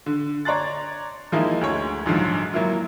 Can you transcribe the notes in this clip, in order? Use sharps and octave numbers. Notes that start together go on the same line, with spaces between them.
D3
C#5 D5 A#5 C6 F#6 A6
F3 G#3 A#3 D#4 E4
D2 G#3 C#5
A#1 G#2 D3 F3 F#3
F#3 A#3 E4 F4